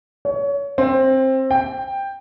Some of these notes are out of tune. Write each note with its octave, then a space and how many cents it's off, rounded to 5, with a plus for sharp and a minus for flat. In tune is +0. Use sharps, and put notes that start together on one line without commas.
C#5 +25
C4 +15
G5 +10